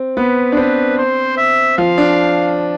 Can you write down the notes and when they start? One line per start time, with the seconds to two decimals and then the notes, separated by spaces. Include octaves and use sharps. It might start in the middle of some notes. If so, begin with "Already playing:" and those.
Already playing: C4
0.17 B3 B4
0.52 D4
0.57 C4 B4
0.98 C5
1.37 E5
1.78 F3 F5
1.98 D4